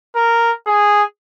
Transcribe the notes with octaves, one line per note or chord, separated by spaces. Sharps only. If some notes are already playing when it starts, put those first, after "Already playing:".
A#4
G#4